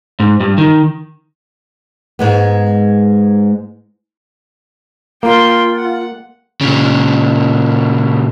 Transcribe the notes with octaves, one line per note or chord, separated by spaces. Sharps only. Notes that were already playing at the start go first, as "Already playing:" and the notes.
G#2
G2
D#3
G#2 G#3 B3
A#3 F4 G5 C6
F#5
A#2 C#3